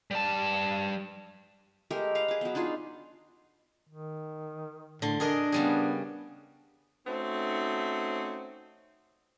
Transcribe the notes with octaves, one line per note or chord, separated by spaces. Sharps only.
G3 A5
G#3 A3 G4 A#4
B4 F5 A#5
G#4 D6
F#3 B3
D4 D#4 F4 G#4
D#3
A2 D3 C6
D4 G#4 A#4 D#5
C#3 G3 B3 G#4
A3 C4 C#4 D#4 F#4